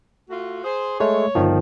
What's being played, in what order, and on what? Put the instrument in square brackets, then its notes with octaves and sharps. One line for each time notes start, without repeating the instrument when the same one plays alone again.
[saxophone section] A3 F4 F#4
G#4 C5
[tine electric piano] G#3 A3 [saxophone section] C#5
[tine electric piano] G1 D#3 F3